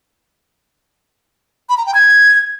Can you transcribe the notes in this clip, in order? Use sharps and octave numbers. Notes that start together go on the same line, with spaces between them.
B5
A#5
G5
G#6